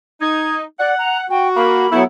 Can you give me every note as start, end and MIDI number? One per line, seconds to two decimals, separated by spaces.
0.21 0.63 63
0.21 0.56 92
0.79 0.94 74
0.79 1.25 78
0.98 1.17 82
1.30 1.86 66
1.30 1.48 79
1.55 1.86 58
1.55 2.00 83
1.92 2.04 54
1.92 2.02 57
1.92 2.04 59
1.92 2.02 64